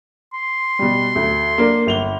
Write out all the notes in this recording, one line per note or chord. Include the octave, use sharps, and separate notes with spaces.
C6
B2 G3
D2
A#3 D4
G1 F7 G7